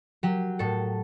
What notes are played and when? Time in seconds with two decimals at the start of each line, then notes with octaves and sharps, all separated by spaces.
0.23 F#3 G4
0.59 A2 A4